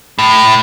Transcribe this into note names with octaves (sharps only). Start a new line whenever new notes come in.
A2